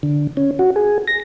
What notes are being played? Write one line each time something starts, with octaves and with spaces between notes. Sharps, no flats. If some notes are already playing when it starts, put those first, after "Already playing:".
D3
C#4
F#4
G#4
A#6